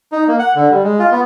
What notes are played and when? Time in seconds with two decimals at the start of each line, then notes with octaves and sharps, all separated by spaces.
0.12 D#4
0.27 A#3
0.39 F#5
0.55 D3
0.71 G3
0.83 G#3
0.99 F4
1.12 B3